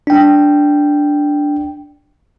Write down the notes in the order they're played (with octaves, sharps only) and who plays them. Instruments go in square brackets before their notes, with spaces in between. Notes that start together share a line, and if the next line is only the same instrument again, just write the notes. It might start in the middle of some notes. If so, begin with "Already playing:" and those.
[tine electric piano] D4 G5